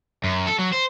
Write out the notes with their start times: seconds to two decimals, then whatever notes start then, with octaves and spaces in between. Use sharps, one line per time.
0.24 F#2
0.47 A4
0.58 F#3
0.72 C5